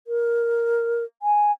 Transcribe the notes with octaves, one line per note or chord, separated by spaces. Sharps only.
A#4
G#5